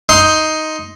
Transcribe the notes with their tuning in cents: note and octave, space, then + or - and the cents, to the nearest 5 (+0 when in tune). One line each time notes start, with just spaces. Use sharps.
D#4 +5 C6 +0